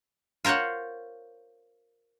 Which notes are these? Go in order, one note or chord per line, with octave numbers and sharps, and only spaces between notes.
F4 A#4 C5 C#5 F#5